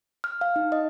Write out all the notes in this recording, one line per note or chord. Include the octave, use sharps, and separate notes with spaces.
F6
F5
D#4
D#5